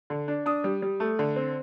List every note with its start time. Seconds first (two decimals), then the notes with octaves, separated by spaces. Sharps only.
0.10 D3
0.28 D4
0.46 D4 D#6
0.64 G3
0.82 G3
1.00 A3
1.19 D3
1.36 C4